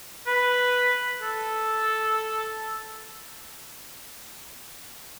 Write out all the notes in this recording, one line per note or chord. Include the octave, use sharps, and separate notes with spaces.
B4
A4